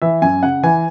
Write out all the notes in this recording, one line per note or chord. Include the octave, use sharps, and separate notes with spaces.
E3 E5
F#2 G#5
C#3 F#5
E3 G#5